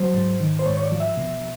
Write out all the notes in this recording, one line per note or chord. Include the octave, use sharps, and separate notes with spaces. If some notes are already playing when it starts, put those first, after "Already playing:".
Already playing: F#3 C5
G#2
D#3
C5
G#2 C#5
C#5
D5
F3
E5
B2